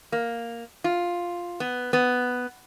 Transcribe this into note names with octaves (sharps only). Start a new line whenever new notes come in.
A#3
F4
B3
B3